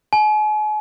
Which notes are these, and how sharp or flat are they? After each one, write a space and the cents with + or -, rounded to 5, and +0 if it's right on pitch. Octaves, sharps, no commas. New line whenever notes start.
G#5 +40